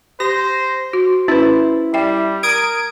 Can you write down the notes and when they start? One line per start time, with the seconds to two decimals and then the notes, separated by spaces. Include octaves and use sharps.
0.20 G4 C5 A#6
0.93 F#4 C5
1.28 C#4 E4 B4
1.94 G3 E5 G5
2.43 A#4 D#6 G#6 D7